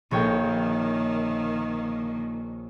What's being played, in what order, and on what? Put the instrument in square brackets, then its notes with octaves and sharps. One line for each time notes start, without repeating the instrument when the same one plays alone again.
[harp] A#1 C#5 G5 [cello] D#3 A#3